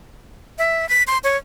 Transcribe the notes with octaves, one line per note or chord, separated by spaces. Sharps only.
E5
B6
C6
C#5